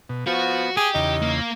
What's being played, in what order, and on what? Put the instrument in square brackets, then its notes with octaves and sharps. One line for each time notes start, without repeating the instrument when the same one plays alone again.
[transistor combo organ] B2
[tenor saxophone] F3 [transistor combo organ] B3 [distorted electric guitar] F#4
[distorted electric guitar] G4 [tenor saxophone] G#4
[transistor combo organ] E2 C#3 [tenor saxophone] D#4
[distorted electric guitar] A#3